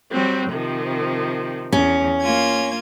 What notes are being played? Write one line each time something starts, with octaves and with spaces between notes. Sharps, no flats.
F#3 G3 C4
C3 D#3 F3
E2 C#4
A#3 F4 G#6